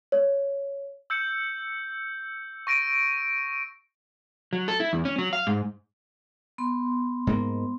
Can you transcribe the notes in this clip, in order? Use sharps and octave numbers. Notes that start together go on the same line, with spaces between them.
C#5
E6 G6 C#7
C#6 A#6 D7 D#7
F#3
A4
E4
E2
C#4
F#3
F5
G#2
B3 C6
G#2 A#3